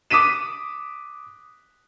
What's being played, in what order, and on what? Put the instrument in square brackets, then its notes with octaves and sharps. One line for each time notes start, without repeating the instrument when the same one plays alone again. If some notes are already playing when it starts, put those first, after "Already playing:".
[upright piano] D6 D#6 B6 D#7 E7